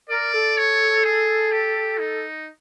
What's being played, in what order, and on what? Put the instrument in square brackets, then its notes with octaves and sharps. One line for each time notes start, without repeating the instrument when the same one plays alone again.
[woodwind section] A#4 [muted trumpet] D5
[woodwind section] A4
[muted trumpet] C#5
G#4
G4
D#4